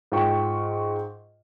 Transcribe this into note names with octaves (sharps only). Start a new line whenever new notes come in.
G#2 F4 G5 C#6